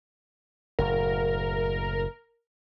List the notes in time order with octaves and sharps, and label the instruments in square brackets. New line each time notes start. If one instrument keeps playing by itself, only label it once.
[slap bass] F#1 A2 [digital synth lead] A#4